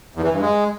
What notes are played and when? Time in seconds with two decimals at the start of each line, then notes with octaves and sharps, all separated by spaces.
0.16 E2
0.24 E3
0.33 G2
0.41 G#3